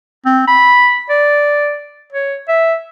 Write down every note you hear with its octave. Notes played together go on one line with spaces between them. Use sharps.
C4
B5
D5
C#5
E5